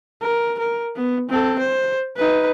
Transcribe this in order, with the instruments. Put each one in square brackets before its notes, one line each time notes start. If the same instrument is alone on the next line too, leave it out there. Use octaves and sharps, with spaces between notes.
[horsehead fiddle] A#4
A#4
B3
C4 A4
C5
D#4 B4